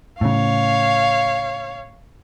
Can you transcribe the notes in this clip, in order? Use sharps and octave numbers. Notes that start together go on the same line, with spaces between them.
A2 C#3 C#5 F5